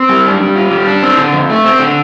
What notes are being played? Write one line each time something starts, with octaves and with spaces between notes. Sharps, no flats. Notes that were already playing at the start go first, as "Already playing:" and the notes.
Already playing: C4
G3
D4
G3
F4
G3
D4
C4
D3
F2
A3
C4
D3